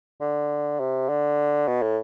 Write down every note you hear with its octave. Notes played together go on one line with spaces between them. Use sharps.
D3
C3
D3
B2
A2